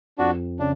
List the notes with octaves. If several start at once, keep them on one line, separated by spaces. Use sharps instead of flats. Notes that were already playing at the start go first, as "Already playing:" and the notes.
F2 D4 F#4
C#3 D4